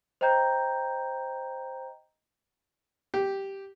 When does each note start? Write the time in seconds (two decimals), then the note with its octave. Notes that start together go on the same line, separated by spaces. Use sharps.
0.21 C5 D#5 G5 A#5 G6
3.14 G4